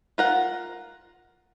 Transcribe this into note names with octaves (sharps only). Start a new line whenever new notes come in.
F4 A#4 F#5